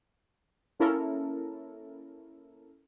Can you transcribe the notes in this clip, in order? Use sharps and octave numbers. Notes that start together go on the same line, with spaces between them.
A#3 C#4 E4 A4 A#4